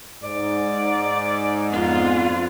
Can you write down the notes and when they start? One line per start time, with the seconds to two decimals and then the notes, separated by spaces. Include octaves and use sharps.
0.23 G#2 D5
1.72 F2 B3 D4 F4